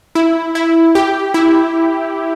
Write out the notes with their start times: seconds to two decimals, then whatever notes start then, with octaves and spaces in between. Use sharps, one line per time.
0.15 E4
0.55 E4
0.95 G4
1.34 E4